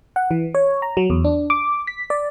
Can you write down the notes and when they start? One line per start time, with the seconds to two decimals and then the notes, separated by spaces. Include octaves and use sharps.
0.16 F#5
0.31 E3
0.55 C#5
0.82 A#5
0.97 F#3
1.10 E2
1.25 D4
1.50 D6
1.87 B6
2.10 D5